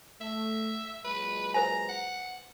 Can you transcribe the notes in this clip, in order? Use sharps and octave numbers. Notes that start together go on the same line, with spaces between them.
A3 E5
A#2 F#3 G#3 B4
B4 C5 G#5 A#5
F#5